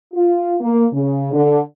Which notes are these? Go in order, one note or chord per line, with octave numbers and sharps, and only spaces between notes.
F4
A#3
C#3
D3